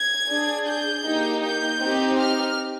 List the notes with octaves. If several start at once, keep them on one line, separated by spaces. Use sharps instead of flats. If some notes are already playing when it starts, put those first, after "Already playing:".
Already playing: G#6
D4 G#4
G6
A#3 D#4 G4
G6
C4 D#4 G4
F6